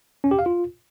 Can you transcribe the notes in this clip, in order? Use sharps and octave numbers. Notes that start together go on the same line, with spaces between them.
C#4
G4
F5
F4